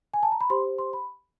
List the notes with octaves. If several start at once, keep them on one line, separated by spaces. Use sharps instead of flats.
G#5
A5
A#5
B5
G4 C5 C6
C6
B5